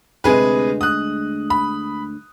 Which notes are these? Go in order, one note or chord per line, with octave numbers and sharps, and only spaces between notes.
D2 C3 G#3 G#4 B4
D#6 F#6
B5